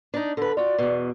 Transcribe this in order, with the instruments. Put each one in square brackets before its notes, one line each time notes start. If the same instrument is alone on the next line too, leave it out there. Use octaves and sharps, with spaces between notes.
[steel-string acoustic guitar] D4 D#4
[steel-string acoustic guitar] D3 B4 [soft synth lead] A4
[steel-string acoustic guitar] F4 F#4 [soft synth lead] D5
[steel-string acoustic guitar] E2 B2